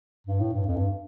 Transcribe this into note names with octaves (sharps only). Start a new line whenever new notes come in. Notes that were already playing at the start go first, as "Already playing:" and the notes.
G2
A2
G2
F2
G2